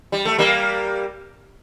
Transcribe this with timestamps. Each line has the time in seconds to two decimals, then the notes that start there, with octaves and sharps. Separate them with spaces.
0.12 G3
0.25 A3
0.38 G3 A#3